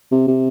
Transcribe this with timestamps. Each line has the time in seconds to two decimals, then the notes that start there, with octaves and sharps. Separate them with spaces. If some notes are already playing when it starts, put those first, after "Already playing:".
0.12 C3
0.28 C3